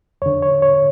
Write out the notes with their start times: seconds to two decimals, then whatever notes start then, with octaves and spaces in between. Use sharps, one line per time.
0.22 F2 D3 C#5
0.42 C#5
0.62 C#5